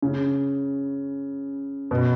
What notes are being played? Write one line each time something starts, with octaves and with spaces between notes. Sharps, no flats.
C#3
B2